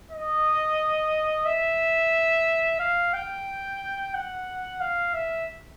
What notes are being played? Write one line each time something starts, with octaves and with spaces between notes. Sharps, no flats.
D#5
E5
F5
G5
F#5
F5
E5